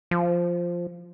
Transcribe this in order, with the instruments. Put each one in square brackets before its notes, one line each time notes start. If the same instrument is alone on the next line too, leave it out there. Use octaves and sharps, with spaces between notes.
[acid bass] F3